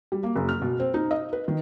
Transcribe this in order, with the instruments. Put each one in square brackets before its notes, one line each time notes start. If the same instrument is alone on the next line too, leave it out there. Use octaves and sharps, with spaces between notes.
[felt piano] G3
A#3
F#1
F6
B2
C4
D#4
D#5
B4
D#3